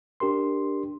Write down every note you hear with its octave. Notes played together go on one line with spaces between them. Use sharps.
D4 G4 A#4 C6